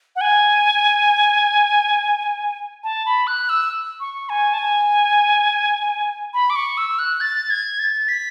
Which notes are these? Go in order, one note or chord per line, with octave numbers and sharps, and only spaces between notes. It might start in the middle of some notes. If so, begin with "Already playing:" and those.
F#5
G#5
A5
B5
F#6
E6
C#6
G#5
A5
G#5
B5
D6
C#6
E6
F#6
A6
G#6
A6
B6